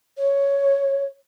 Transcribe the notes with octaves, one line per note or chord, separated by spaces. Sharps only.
C#5